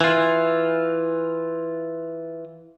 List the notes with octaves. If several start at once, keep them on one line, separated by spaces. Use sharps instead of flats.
E3 F4